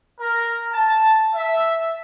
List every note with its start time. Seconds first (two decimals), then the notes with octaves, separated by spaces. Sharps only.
0.20 A#4
0.73 A5
1.35 E5